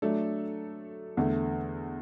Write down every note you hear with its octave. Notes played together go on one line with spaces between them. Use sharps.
F#3 A3 D4 A4
E2 D3 A3